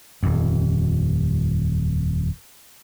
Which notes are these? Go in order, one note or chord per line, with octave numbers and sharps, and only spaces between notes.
D#1 F2